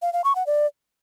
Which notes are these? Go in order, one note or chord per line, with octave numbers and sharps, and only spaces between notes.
F5
F5
C#6
F#5
D5